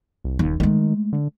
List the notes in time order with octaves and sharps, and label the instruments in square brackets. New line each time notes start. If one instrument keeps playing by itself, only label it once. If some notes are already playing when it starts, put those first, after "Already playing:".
[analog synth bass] C2
[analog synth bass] D#1 [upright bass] D#2
[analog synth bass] D#3 [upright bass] G#3 A3
[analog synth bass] D3